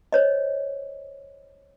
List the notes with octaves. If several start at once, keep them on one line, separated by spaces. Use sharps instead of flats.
C5 C#5 D#5